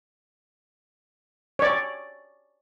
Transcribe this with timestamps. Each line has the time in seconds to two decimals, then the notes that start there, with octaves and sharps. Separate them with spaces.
1.59 C#5 D5